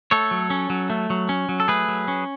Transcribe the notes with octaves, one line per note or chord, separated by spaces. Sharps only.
A3 A4 C#5
F#3
C#4
F#3
A3
F#3
C#4
F#3
A4
A3 G#4 B4
F#3
C#4